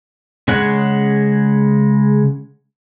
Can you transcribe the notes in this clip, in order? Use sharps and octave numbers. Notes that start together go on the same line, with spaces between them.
C#3 G#3 C#5 F#5